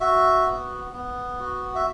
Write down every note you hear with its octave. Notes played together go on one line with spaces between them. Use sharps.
F#4 E5
B3
B3
F#4
E5